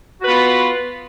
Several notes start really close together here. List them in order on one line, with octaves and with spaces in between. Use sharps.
F#4 B4 B3 F4